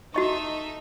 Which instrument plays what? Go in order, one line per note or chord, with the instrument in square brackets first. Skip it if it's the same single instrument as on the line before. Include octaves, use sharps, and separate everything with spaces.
[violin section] D#4 A4 E5 [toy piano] F#4 D#5 C#6